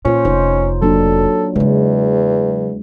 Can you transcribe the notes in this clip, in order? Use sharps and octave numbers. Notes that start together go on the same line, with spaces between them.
A#2 C#4 F4 C5
F1 D#4 C5 C#5
F#3 A#3 D4 A4
E2 C#3 F#3 G#3